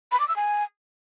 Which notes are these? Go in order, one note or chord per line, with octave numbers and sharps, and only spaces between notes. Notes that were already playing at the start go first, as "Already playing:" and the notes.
B5
D6
E6
G#5